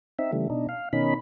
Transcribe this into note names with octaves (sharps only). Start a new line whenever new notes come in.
C4 D#4 E5
C#3 E3 G3 A3
B2 D4 D#4
F5
B2 D#3 C#4 D#4 B5